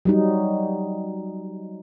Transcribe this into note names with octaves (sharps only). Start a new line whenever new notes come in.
F#3 G3 D#4